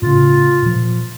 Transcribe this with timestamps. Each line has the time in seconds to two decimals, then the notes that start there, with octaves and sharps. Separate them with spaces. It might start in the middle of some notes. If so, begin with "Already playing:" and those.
0.02 A2 C#3 F4
0.62 A#2 F3